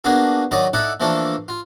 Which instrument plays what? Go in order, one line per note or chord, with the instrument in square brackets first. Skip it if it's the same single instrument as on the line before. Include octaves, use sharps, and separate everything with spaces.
[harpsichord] A#3 B3 D4 F#4 G#4
D#3 F#3 D#4 D5 D#5 D6
D#4 E4 A4 D5 F#5
E3 F3 A3 A#3 D4 A4
F4